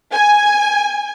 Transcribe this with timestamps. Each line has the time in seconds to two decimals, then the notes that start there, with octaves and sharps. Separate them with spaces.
0.12 G#5